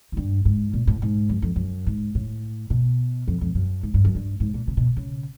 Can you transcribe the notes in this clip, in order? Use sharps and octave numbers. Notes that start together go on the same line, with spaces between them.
G#2
G2
G#2
A#2
A2
G#2
F#2
F2
F#2
G#2
A2
B2
F2
F2
F#2
G#2
G2
F#2
G2
G#2
A#2
C3
B2
C#3